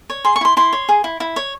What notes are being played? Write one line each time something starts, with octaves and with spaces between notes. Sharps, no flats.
C#5
G#4 C6
C#6
E4 C6
E4 C6
C#5
G#4
E4
E4
C#5